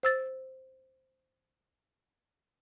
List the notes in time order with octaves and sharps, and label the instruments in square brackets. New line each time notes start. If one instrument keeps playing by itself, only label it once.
[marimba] C5 E6 A6